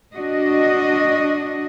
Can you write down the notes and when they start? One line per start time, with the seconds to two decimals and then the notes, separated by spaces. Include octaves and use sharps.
0.14 D4 F#4 D#5